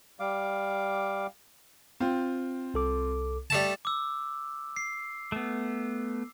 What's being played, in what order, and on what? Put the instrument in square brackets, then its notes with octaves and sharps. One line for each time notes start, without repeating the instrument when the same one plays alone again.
[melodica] G3 F5 D6
[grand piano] C4 F4
[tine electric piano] C2 A4 D6
[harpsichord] G3 A3 A5
[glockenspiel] D6 E6
C7
[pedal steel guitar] A3 B3